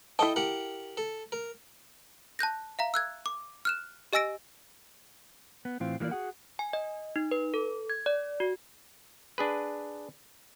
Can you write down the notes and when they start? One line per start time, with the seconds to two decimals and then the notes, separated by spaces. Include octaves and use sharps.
0.19 E4 A4 D#5 G5 A5
0.36 G4 A#4 F#5
0.97 A4
1.32 A#4
2.39 A5 F#6 G6 A#6
2.79 E5 F5 A#5
2.94 E6 F#6 G#6
3.26 D6
3.65 F6 F#6 E7
4.13 G4 D#5 G#5 E6 A#6 D7
5.65 B3
5.80 A2 E3 C4 F4
6.00 E3 G3 A#3 F4 D5
6.11 F#4 G#4 F#5
6.59 G#5
6.73 D#5
7.16 D#4
7.31 B4
7.54 A4
7.90 G#6
8.06 D5
8.40 F#4
9.38 D4 G#4 B4